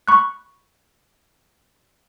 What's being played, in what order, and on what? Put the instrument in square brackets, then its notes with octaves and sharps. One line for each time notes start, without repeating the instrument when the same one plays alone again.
[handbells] B5 C#6 F#6